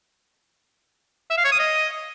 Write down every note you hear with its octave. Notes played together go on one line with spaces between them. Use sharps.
E5
F5
C#5
D#6
D#5